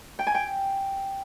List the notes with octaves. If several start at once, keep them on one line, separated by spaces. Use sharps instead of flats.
G5
G#5
G5